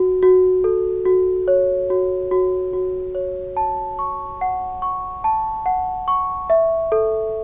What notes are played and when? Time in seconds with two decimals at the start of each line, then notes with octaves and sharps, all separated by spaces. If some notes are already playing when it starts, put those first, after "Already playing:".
Already playing: F#4
0.23 F#4
0.64 A4
1.05 F#4
1.48 C#5
1.90 F#4
2.31 F#4
2.73 F#4
3.15 C#5
3.57 A5
3.99 C#6
4.41 F#5
4.82 C#6
5.24 A5
5.66 F#5
6.08 C#6
6.50 E5
6.92 A4